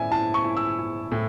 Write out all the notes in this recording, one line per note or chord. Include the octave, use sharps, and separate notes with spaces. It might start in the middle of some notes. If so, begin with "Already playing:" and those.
Already playing: A2 C#4 E4 D5 E5 G#5
E4 A5
C#6
E4
E6
E4
A2